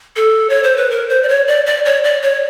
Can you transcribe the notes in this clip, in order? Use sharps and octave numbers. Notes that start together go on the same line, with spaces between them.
A4
C#5
C5
B4
A#4
C5
D5
C#5
D5
D5
C#5
D5
C#5